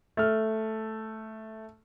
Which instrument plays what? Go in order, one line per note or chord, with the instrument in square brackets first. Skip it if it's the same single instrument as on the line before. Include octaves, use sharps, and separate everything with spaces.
[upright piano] A3 F6